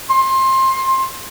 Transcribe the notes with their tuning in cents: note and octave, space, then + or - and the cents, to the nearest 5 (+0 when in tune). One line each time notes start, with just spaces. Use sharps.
C6 +20